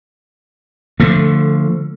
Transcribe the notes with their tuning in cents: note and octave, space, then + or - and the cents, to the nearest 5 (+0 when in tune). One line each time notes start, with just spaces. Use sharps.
D3 +0 F3 +0 A3 +20